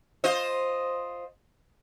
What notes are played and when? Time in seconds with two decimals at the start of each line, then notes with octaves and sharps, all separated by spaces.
0.24 F4 C5 D#5